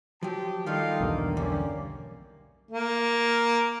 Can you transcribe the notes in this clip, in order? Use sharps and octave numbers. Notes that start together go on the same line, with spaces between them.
F3 F#3 G4 G5 A5
D#3 G3 F4 A4 D#5 F5 G5
B1 E2 G2 A#3
D3 C#4 G4 D5
A#3